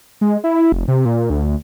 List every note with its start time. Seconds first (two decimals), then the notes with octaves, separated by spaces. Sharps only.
0.21 G#3
0.44 E4
0.72 F1
0.88 C3
1.05 A#2
1.30 D2